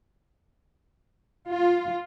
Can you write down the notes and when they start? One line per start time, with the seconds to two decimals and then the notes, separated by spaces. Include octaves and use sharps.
1.50 F4